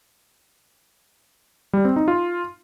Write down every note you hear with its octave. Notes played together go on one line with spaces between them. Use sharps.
G3
C4
D#4
F4